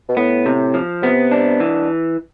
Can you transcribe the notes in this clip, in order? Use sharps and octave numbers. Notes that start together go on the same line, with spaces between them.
B2
A2 B3
C3
F3
C3 B3
D4
E3